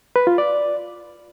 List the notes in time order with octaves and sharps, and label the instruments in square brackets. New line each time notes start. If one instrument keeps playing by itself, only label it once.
[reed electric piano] B4
F4
D5